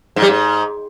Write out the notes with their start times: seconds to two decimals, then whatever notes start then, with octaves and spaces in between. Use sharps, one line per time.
0.16 G#2
0.22 G3
0.28 G#2